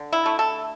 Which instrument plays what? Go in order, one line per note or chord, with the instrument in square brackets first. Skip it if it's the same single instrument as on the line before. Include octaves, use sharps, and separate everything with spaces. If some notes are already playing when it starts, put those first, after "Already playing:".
Already playing: [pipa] D3
E4
A3
A4